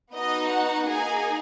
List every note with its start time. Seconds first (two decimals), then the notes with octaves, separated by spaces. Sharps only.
0.14 B3 D#4 F#4 D#5
0.51 F#5
0.89 A#3 D#4 G#4 G#5